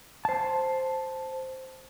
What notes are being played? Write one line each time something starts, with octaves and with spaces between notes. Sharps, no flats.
C5 A5